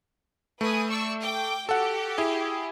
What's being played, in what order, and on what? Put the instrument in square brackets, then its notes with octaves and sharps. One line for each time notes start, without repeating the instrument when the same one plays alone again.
[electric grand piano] A3 [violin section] B4 G#5 D#6
[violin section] D5 C#6 E6
G5 D6
[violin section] F#4 G4 [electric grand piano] A4 F#5
[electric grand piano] E4 G#4